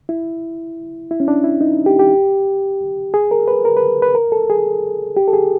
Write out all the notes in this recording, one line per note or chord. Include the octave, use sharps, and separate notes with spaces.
E4
E4
C#4
D4
E4
D#4
G4
G4
G#4
A#4
B4
A#4
B4
B4
A#4
A4
G#4
G4
A4
G#4